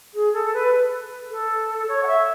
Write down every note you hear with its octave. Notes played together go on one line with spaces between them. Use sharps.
G#4
A4
B4
A4
C#5
F#5
E5